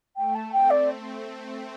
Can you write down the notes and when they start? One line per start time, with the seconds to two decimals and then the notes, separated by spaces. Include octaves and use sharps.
0.17 A3 G5
0.35 A5
0.52 C4 G5
0.70 D5